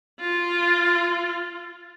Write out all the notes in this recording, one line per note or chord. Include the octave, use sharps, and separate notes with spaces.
F4